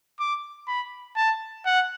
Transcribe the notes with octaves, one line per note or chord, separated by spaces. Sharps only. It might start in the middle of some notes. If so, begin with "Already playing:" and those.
D6
B5
A5
F#5